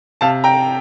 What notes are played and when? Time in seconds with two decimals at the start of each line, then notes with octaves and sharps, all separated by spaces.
0.21 C3 F5 A5
0.44 G5 A#5